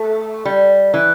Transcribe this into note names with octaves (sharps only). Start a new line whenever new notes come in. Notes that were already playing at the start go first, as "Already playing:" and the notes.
Already playing: A3
G3
E3